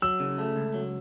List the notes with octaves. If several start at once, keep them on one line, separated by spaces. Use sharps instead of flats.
F#3 E6
C#3
A3
C#2
F#3